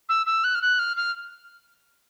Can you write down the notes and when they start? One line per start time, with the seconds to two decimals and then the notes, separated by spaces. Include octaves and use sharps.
0.09 E6
0.26 E6
0.44 F#6
0.55 F6
0.62 F#6
0.79 F6
0.97 F6